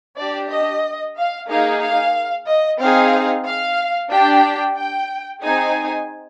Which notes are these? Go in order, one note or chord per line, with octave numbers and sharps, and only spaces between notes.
D4 G4 D5
D#5
F5
A#3 D#4 G#4 F5
F5
D#5
C4 D#4 G#4 F5
F5
D4 G4 G5
G5
C4 D#4 G#4 G#5